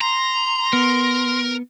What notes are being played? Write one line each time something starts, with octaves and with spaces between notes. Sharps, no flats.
A#5 C6
B3 A#4